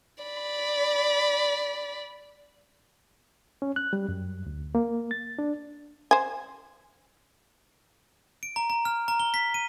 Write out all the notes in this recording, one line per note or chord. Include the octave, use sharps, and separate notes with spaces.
D5 B5
C#4
F#6
G3
F#2
D2
A#3
A6
D4
C5 G#5
D7
A#5
A#5
F6
A#5
G7
B6
D#7